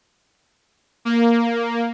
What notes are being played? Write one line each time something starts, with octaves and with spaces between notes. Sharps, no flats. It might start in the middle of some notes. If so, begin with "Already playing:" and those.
A#3